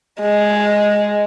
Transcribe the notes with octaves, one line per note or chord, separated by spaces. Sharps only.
G#3